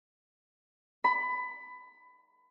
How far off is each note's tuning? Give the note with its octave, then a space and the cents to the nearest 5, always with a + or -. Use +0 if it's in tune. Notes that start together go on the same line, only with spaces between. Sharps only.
B5 +20